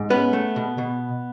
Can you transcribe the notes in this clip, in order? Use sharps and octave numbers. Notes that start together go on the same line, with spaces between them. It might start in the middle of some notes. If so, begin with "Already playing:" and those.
Already playing: G#2
B3 C#4 B4
A3
B2
B2